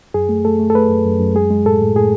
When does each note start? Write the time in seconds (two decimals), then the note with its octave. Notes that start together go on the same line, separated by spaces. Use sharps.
0.14 F#2 G#4
0.29 A3
0.45 A3 A4
0.59 A3
0.70 A4
0.75 A3 B4
0.89 F#2
1.06 F#2
1.20 F#2
1.35 G#3 G#4
1.50 G#3
1.65 A2 A4
1.81 A2
1.96 A2 G#4